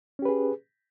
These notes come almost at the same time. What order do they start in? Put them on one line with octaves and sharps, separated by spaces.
C#4 G4 B4 G#4